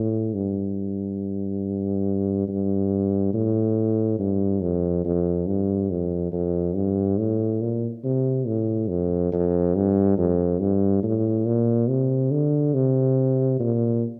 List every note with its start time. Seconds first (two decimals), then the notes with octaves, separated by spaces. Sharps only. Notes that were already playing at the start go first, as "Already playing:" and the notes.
Already playing: A2
0.34 G2
2.48 G2
3.34 A2
4.19 G2
4.62 F2
5.05 F2
5.47 G2
5.91 F2
6.32 F2
6.75 G2
7.19 A2
7.61 A#2
8.04 C3
8.47 A2
8.89 F2
9.32 F2
9.75 G2
10.18 F2
10.61 G2
11.03 A2
11.46 A#2
11.89 C3
12.31 D3
12.74 C3
13.60 A#2